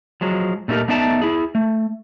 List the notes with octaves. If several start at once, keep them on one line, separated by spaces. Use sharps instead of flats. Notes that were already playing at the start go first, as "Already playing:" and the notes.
F3 F#3 G#3
A#2 A3 C4 D#4 G4 A#4
A3 B3 D#4 D5 E5 A5
E4 G#4
A3